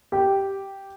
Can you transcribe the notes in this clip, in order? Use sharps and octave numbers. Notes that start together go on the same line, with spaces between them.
G4 G5